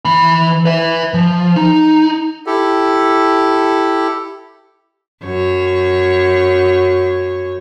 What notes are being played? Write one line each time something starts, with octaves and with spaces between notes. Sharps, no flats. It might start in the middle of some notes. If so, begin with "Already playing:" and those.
E3 B5
B4 E5
F3
D#4
E4 G4 A4
F#2 C#5